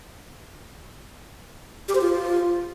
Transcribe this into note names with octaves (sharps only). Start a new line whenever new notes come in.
G4
C5
F4